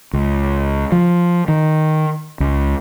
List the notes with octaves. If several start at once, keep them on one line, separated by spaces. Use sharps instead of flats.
C#2
F3
D#3
C#2